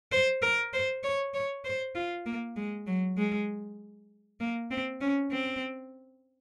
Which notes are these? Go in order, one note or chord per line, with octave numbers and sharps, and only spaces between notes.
C5
A#4
C5
C#5
C#5
C5
F4
A#3
G#3
F#3
G#3
A#3
C4
C#4
C4